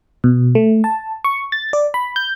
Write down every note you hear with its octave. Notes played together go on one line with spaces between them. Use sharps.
B2
A3
A5
C#6
A6
D5
B5
G6